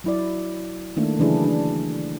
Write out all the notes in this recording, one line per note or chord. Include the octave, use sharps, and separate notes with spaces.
F#3 E4 D5
D#3 A3 A#3 D4 E4
C#3 E3 F#3 D4 E4 G#4
D4